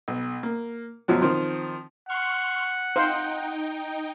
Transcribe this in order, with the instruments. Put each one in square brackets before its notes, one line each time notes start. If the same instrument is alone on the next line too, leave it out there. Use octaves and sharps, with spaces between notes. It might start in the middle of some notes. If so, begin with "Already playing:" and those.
[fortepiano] B1
A#3
F#2 B2 F3 F#3
D#3 F3 C4 C6
[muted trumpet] F#5 [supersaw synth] C6 C#6 F6
[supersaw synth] D#4 G5 [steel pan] C5 F5